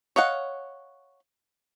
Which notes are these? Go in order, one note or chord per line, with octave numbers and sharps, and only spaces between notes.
C#5 D#5 F5 F#5